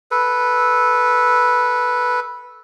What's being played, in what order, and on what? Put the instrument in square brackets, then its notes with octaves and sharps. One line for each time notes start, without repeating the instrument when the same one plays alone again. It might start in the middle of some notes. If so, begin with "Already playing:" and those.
[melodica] A4 B4